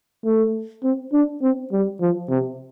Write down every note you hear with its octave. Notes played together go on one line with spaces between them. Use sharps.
A3
C4
D4
C4
G3
F3
C3